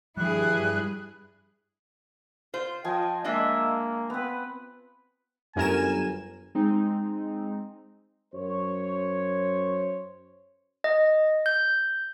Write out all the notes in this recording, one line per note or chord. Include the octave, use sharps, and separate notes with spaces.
G2 F3 G3 E4 G#4 F#6
F4 C5
F3 D#5 G5 G#5
G#3 A#3 D4 D#5 E5
B3 C4 B4
G1 F#2 A#4 G#5 E7
G#3 C4 D#4
F#2 C5 C#5
D#5
G6